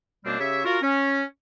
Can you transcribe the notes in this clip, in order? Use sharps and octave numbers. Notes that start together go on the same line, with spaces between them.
F#2 B2 G3 A#3 C4 D4
C#3 G4 C#5 E5
F4 F#4 A#4
C#4